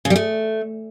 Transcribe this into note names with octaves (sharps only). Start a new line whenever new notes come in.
C#3
G3
A3